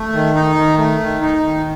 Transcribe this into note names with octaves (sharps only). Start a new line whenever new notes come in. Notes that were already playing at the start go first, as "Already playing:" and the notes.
Already playing: A3
D#3
D#4
D#3
A3
D#3
D#4
D#3